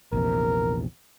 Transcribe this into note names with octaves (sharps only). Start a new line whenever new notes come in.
A#1 E2 C3 A#4